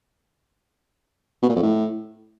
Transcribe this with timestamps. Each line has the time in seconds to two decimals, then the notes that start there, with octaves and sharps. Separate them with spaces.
1.42 B2
1.49 A#2
1.56 F2
1.62 A2